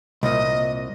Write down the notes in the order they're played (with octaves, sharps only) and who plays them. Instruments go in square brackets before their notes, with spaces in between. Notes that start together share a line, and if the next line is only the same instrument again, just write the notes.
[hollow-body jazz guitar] C2 A#2 [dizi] D#5